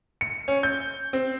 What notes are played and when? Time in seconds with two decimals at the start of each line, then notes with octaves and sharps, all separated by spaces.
0.21 C#7
0.48 C#4
0.63 G6
1.13 C4